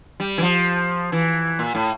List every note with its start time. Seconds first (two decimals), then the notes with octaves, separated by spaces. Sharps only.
0.20 G3
0.38 E3
0.43 F3
1.12 E3
1.59 A#2
1.75 A2